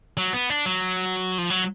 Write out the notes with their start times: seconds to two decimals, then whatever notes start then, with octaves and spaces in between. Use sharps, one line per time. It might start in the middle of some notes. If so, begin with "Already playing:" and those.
0.17 F#3
0.33 B3
0.50 D4
0.66 F#3
1.38 F3
1.50 F#3